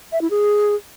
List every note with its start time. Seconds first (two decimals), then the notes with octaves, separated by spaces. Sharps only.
0.12 E5
0.21 E4
0.30 G#4